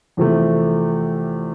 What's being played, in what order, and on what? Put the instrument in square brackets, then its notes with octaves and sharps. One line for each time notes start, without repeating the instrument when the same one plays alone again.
[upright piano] E2 C3 F3 A3 C4